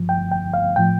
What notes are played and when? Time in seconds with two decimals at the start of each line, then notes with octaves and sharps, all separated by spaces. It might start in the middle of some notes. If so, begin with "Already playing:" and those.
Already playing: G2 F3
0.09 G5
0.32 G5
0.54 F5
0.76 A2 F3 G5